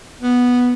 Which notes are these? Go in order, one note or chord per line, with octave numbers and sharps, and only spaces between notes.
B3